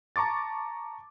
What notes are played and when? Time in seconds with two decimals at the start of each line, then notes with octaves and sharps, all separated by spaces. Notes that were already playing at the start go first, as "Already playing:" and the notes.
0.16 A5 A#5 C#6 D6 A6